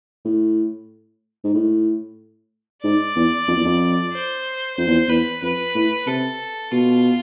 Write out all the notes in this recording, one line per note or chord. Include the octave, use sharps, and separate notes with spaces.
A2
G#2
A2
G#2 D5
E2
F2
E2
F2
C5
F2 C5
E2
E2 B4
F2 B4
A2
C3 A4
B2 F4